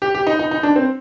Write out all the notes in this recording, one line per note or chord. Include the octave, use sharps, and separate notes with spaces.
G4
G4
D#4
D#4
D#4
D4
C4